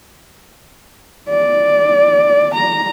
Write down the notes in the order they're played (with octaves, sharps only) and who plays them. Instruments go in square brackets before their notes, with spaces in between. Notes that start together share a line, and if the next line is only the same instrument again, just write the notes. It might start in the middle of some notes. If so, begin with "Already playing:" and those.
[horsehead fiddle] D5
A#5